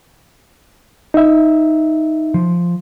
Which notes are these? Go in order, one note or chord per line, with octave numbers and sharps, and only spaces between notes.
D#4 E5
F3